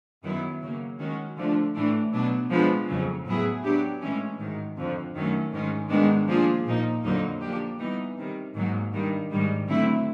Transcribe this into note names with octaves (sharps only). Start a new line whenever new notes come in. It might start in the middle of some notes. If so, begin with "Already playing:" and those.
F#2 D#3 F#3 B3 E4
C#3 F#3 A#3
D#3 G#3 C#4 F#4
D3 F3 A3 D4
A2 E3 A3 D4
B2 F#3 B3 D4
F3 G#3 B3 D4
F2 C#3 F#3
A2 F#3 B3 E4 G#4
F#3 B3 D4 G4
A2 E3 G#3 C#4
G#2 D#3 F#3
F2 D3 F3
F#2 D#3 F#3 A3 C#4
G#2 D#3 G#3 C#4
G#2 D#3 G#3 B3 D4
F3 A#3 D4 F4 G#4
A#2 F3 A#3 D#4
F2 D3 F#3 A#3 D#4
F3 A#3 D4 G4
E3 G3 B3 D#4
C3 D#3 G3
G#2 D#3 F#3 A#3
G2 D#3 G3
G#2 D#3 G3
D3 F#3 A3 C4 E4